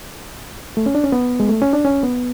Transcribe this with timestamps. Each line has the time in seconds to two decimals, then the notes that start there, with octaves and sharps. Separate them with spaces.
0.77 A3
0.86 C#4
0.95 D4
1.04 C#4
1.12 B3
1.40 G#3
1.49 A3
1.62 C#4
1.73 D4
1.85 C#4
2.03 B3